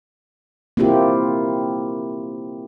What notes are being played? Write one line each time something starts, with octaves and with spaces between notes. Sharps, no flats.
A#3 C4 E4 F4 G4